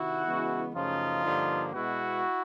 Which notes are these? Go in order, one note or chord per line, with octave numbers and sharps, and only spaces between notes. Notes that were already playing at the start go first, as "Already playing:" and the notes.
Already playing: C3 D#3 E4 F#4
C#3 E3 G#3 B3
F#2 C#3 F3 A3 D#4 F4
G2 D3 F3 A#3
B2 G#3 B3 E4 F#4